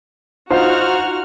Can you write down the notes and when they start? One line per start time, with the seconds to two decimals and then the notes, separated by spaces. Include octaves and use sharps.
0.50 D#4 F4 F#4 C5 A#5 F6